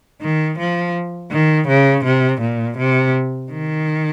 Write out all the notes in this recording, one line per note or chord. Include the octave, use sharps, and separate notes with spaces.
D#3
F3
D#3
C#3
C3
A#2
C3
D#3